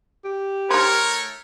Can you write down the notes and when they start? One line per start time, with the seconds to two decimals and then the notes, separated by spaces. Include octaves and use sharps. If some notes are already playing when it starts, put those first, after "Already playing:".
0.25 G4
0.70 D#3 A3 A#4 C5 C#5